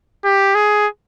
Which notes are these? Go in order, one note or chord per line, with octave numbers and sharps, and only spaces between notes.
G4
G#4